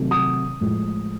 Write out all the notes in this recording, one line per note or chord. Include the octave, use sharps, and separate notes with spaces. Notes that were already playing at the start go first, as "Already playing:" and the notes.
Already playing: C3 D#3 F#3 A3
D#6
A2 F3 G#3